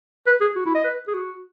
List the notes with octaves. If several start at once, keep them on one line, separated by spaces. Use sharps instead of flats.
B4
G#4
F#4
E4
D#5
B4
G#4
F#4